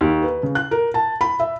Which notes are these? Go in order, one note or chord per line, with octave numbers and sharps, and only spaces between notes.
D#2
B4
C#3
F#6
A#4
A5
B5
E5